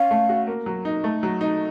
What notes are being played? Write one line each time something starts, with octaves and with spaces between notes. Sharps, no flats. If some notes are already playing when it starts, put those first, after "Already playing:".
Already playing: C#4 F5
A3
F#4
A#3
F#3
D#4
A3
F#3
D#4